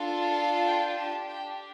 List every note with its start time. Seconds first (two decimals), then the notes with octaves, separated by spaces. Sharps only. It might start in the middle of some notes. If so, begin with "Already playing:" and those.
Already playing: D4 F4 A4
0.35 A5
0.67 G5
0.98 D4 G4 A5
1.29 G5